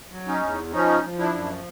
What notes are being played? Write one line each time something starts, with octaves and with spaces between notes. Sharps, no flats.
F#3
C#4 D#4
E2
F3 C#4 D#4
F3
D4 E4
F#2